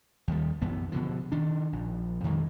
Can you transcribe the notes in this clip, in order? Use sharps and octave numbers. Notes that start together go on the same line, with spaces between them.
D#2 D#3 G3
B1 F#2 E3 B3
B2 D3 F3
D#3 D4
A#1
F2 D#3 F#3 G#3